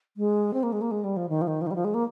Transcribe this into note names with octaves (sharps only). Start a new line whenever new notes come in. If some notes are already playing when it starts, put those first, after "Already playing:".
G#3
C4
A#3
G#3
A#3
G#3
G3
F3
D#3
F3
D#3
F3
D#3
G3
F3
G#3
A#3